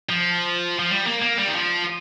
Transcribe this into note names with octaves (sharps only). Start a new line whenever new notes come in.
F3
F3
G3
A#3
A#3
G3
D#3
F3